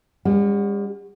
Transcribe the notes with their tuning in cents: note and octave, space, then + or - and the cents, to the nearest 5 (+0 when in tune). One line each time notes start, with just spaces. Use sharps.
G3 +45 C#4 +15 F#4 +0